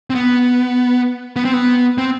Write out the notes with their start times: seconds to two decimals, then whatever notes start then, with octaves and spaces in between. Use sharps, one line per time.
0.10 C4
0.15 B3
1.36 B3
1.45 C4
1.54 B3
1.98 C4